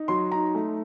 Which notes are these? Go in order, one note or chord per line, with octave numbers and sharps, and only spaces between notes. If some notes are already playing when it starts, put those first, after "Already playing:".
Already playing: D#4
F#3 C6
D#4 A#5
A3